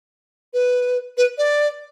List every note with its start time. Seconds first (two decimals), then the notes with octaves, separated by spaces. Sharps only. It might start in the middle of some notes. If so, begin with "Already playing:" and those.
0.54 B4
1.17 B4
1.38 D5